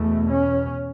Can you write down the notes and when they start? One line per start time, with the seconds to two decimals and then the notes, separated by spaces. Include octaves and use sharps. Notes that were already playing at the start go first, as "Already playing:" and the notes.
Already playing: E2 B2 A3
0.31 C#4